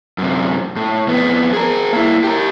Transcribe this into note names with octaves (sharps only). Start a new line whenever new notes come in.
F#2 C3
A2
F2 B3
G#4 A#4
A#3 E4
G4 A#4